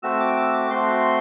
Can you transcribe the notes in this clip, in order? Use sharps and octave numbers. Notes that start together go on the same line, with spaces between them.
A3 C4 F#4 E6
D6
E6
D6
A3 C4 F#4 C6